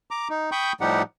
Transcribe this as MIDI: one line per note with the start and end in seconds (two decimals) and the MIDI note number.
0.11 0.28 82
0.11 0.28 86
0.30 0.50 63
0.52 0.73 79
0.52 0.73 83
0.52 0.73 85
0.52 0.73 87
0.52 0.73 91
0.81 1.02 45
0.81 1.02 53
0.81 1.02 55
0.81 1.02 63
0.81 1.02 67
0.81 1.02 78